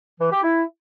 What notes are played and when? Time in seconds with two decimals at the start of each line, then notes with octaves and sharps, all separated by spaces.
0.20 E3
0.31 G4
0.43 E4